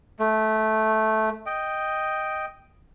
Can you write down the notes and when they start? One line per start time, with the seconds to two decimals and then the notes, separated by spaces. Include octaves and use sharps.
0.19 A3
1.46 D#5 G5